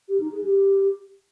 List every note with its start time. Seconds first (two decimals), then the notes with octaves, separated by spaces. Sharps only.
0.08 G4
0.20 D#4
0.32 G#4
0.44 G4